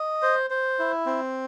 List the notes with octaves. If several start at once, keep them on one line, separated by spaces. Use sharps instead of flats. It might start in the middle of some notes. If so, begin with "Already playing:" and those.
Already playing: D#5
C5
C5
E4
C4